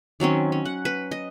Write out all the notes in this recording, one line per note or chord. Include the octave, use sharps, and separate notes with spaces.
D#3 F#3 C4 C#4
C#4
F#5
B4
D#5